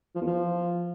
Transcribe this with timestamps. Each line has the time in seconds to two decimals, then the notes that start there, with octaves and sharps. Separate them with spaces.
0.15 F3
0.21 E2
0.27 F3